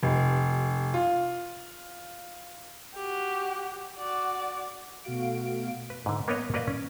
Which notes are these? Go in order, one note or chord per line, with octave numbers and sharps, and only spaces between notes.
F1
F4
F#4 G4
F#4 D5
B2 A3 F#4 F5 D7
B4
G#2 D3
A#3 B3 A#4 B4 C#5 D#5
A#3 A#4 B4 D5 D#5 F5
C#4